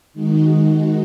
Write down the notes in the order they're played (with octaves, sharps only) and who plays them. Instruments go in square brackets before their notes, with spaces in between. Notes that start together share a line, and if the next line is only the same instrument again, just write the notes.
[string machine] D#3 G#3 D#4 F#4